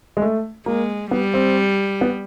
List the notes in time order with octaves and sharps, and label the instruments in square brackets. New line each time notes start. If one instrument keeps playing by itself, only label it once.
[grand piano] G#3
A3
[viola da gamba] G#3 [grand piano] A#3
[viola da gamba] G3 [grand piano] B3
[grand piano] C4
B3